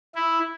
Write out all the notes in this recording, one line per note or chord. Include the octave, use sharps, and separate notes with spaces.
E4